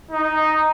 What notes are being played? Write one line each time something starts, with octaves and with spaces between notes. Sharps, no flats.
D#4